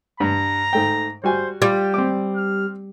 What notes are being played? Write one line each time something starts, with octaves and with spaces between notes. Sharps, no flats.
G2 A#5
G#2 A3 G5
G3 F#4 C5 G#5
G3 F4 G4
C4 D6
F6